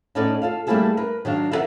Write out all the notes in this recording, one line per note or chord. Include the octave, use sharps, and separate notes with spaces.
A2 B3 C#4 D#4 A4 D5
F4 A4 F5
G3 A3 A#3 E4 G#4 A4
A#4 B4
D#3 F#3 D4 F5
E4 A4 A#4 C5 E5 F#5